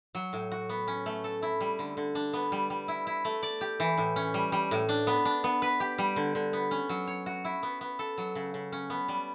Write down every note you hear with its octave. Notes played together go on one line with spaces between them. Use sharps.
F#3
A2
F#4
B3
C#4
A3
A4
E4
G3
D3
D3
D4
B3
G3
G3
E4
E4
A3
D5
G4
E3
A2
C#4
G3
G3
A2
D4
B3
D4
B3
B4
G4
G3
D3
D3
B3
C#4
F#3
C#5
F#4
E4
B3
B3
A4
F#3
C#3
C#3
C#4
B3
G3